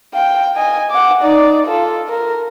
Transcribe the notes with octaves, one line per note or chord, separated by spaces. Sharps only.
F5 G5
D#5 G#5
F#5 D6
D#4 D5
F4 A4
A#4